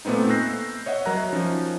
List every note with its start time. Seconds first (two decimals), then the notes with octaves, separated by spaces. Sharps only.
0.05 A#2 A3 B3 C4 D#4
0.29 E6 F#6 G6 A#6 C7
0.86 C#5 D#5 E5 F#5
1.05 F#3 A#4 A#5 F#6
1.33 F3 C#4 D#4